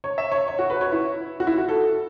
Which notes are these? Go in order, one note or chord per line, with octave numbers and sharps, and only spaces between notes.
C#5
E5
C#5
C#5
F#4
B4
C#5
E4
F#4
E4
F#4
A4